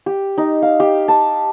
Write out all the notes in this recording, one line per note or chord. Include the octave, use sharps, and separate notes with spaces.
G4
D#4
F5
G4
A5